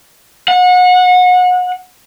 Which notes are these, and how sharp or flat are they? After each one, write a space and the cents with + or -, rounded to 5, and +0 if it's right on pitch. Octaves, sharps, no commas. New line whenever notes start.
F#5 -30